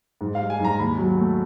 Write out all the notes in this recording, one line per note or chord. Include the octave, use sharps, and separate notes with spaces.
G#2
F5
G3
G#5
G#2 A#5
D#2 B5
F#3
A3